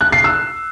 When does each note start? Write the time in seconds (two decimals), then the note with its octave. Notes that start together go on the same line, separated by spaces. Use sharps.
0.01 F#6
0.12 C7
0.24 E6